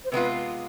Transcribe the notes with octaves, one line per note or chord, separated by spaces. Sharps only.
C5
C3 G#3 B3 F4 B4